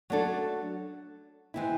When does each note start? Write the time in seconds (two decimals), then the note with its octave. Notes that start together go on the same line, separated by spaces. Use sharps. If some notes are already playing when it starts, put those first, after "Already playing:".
0.10 F#3 A3 D4 F#4 A4
1.54 E3 G#3 C4 E4